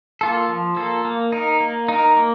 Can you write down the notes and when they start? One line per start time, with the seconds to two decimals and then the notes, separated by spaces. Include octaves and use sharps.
0.21 A#3 F4 A4
0.49 F3
0.76 A#3 F4 A4
1.05 A#3
1.32 D#4 A#4
1.60 A#3
1.88 D#4 A#4
2.17 A#3